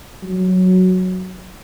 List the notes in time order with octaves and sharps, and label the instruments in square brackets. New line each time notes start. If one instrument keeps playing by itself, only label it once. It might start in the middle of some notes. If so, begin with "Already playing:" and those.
[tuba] F#3